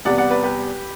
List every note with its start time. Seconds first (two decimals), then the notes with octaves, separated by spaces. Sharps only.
0.05 E2 C3 G3 B3 D5 F#5
0.18 D5 F#5
0.30 B4 D5
0.43 G4 B4